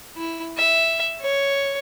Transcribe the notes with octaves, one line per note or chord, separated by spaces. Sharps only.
E4
E5
C#5